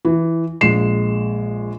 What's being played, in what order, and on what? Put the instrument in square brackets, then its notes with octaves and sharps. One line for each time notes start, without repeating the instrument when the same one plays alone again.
[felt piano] E3
A#1 G#3 C7 E7